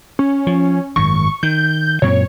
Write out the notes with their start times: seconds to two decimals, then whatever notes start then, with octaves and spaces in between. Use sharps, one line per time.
0.19 C#4
0.47 F3
0.96 G#1 F#2 C#6
1.43 D#3 G6
2.02 F#2 A#2 C4 C#5